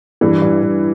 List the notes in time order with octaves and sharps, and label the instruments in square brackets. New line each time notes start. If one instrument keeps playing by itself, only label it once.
[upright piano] G2 [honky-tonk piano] E3
[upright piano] G2
G2